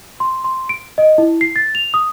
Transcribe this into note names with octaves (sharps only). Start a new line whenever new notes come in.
C6
C6
D7
D#5
E4
C7
A6
F7
D#6